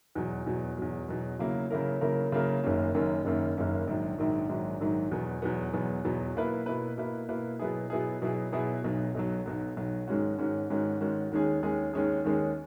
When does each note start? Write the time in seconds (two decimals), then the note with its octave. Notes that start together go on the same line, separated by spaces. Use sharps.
0.15 E2 B2 F#3
0.46 E2 B2 F#3
0.77 E2 B2 F#3
1.08 E2 B2 F#3
1.39 C#3 F#3 A#3 E4 A#4
1.70 C#3 F#3 A#3 E4 A#4
2.01 C#3 F#3 A#3 E4 A#4
2.32 C#3 F#3 A#3 E4 A#4
2.64 F#1 F#2 D#3 A#3 C#4
2.94 F#1 F#2 D#3 A#3 C#4
3.25 F#1 F#2 D#3 A#3 C#4
3.57 F#1 F#2 D#3 A#3 C#4
3.87 A#1 G#2 D#3 F#3
4.18 A#1 G#2 D#3 F#3
4.49 A#1 G#2 D#3 F#3
4.80 A#1 G#2 D#3 F#3
5.11 E2 B2 F#3 B3
5.42 E2 B2 F#3 B3
5.73 E2 B2 F#3 B3
6.05 E2 B2 F#3 B3
6.35 B2 A#3 E4 B4
6.66 B2 A#3 E4 B4
6.97 B2 A#3 E4 B4
7.29 B2 A#3 E4 B4
7.59 B2 F#3 B3 E4 G#4
7.90 B2 F#3 B3 E4 G#4
8.22 B2 F#3 B3 E4 G#4
8.52 B2 F#3 B3 E4 G#4
8.84 B1 B2 F#3
9.15 B1 B2 F#3
9.46 B1 B2 F#3
9.77 B1 B2 F#3
10.08 G#2 D#3 G#3 C#4 F#4
10.38 G#2 D#3 G#3 C#4 F#4
10.70 G#2 D#3 G#3 C#4 F#4
11.00 G#2 D#3 G#3 C#4 F#4
11.32 D#2 D#3 G#3 C#4 G#4
11.63 D#2 D#3 G#3 C#4 G#4
11.93 D#2 D#3 G#3 C#4 G#4
12.25 D#2 D#3 G#3 C#4 G#4